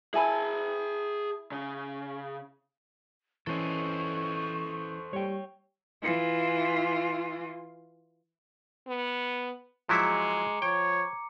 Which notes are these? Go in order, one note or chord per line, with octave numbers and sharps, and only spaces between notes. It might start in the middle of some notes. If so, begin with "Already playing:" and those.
E4 G#4 G#5 A5 B5
C#3
E3 C#4 A4 C5 D#5 C#6
G3 C#5 G5
E3 F4
B3
F3 F#3 G#3 E4 A#5 D6 C#7
F3 C#5 G5